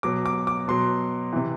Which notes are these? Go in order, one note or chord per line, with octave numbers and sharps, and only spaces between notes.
B2 F#3 D6
D6
D6
B2 F#3 C6
C3 E3